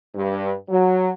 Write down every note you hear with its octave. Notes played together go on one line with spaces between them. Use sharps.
G2
F#3